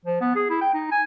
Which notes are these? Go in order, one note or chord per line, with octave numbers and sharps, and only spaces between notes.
F3
B3
G#4
E4
G5
D#4
G#5